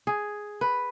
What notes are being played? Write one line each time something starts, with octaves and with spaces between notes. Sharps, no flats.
G#4
B4